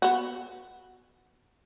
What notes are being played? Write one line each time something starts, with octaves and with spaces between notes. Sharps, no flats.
B3 F#4